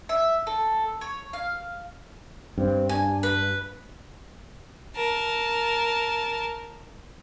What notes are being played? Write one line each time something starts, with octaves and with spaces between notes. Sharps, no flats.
E5
A4
C#5
F5
G2 C4
D4 G#5
B4
A#4 A5